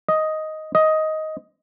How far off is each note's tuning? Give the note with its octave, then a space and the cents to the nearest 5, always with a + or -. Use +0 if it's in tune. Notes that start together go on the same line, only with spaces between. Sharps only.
D#5 +5
D#5 +10